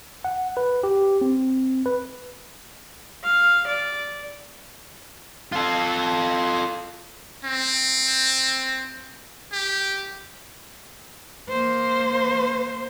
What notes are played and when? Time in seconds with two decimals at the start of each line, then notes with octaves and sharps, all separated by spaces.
0.25 F#5
0.57 B4
0.83 G4
1.21 C4
1.86 B4
3.24 F5
3.67 D5
5.52 F4 A4
7.45 C4
9.52 G4
11.49 A#3 C5